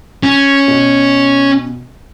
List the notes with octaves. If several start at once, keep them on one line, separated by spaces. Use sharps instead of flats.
C#4
B2